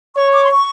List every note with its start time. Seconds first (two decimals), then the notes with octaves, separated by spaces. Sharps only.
0.17 C#5 C#6
0.34 D6
0.45 C6
0.50 C#6